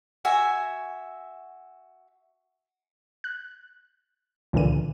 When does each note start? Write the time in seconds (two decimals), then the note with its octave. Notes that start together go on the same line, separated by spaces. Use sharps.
0.25 F#4 E5 G#5
3.24 F#6
4.53 C#2 A#2 D3 E3 D#7